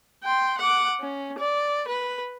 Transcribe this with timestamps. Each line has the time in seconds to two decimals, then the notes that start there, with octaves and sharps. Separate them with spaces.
0.23 G5 C6
0.58 F#5 D6
1.01 C#4
1.39 D5
1.88 B4